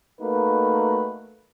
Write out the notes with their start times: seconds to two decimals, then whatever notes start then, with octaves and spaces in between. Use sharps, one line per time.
0.21 A3 A#3 D#4 F#4 B4